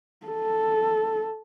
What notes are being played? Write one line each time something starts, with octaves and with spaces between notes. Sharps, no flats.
A4